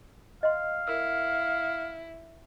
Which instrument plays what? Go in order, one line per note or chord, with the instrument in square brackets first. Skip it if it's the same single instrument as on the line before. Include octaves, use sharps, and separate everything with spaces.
[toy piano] D#5 C6 [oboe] F5
[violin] E4 [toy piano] A4 A#4 E6